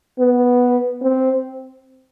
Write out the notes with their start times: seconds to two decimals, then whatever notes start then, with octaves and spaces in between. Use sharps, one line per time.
0.20 B3
1.02 C4